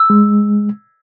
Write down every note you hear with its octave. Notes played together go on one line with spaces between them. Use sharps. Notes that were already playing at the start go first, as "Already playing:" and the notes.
Already playing: E6
G#3